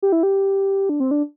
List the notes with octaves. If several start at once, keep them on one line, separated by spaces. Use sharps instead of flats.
G4
E4
G4
D4
C4
D4